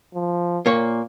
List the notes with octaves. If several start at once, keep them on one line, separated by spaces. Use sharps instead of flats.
F3
A#2 A#3 C#5